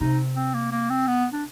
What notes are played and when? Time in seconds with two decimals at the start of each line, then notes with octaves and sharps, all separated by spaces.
0.01 C3 D#4
0.36 C4
0.54 A#3
0.72 A#3
0.90 C4
1.08 B3
1.33 D4